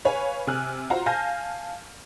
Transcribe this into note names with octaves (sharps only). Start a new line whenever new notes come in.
B4 C#5 F5 G#5
C3 G#5 F6 F#6
F4 F#4 C5 F5 A#5
F5 G#5 A5 F6 G6 A#6